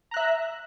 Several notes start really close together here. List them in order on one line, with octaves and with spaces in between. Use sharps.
A#5 F#6 E5